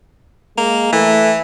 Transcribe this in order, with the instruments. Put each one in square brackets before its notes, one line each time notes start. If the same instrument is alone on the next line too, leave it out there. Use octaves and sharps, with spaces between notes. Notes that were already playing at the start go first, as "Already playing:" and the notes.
[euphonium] G#3 [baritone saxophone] A#3
[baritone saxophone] E3 [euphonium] A3